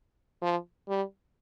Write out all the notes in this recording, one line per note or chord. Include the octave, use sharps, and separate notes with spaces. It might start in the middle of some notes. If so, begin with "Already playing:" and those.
F3
G3